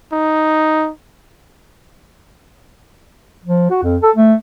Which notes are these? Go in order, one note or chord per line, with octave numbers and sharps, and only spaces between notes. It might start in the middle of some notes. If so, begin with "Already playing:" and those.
D#4
F3
F#4
F2
A4
A3